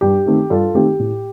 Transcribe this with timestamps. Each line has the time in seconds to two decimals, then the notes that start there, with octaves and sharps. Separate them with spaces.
0.01 G2 G4
0.26 D#3 A3 C4
0.50 G2 F4 A4
0.75 D#3 A3 C4 G4
0.99 A2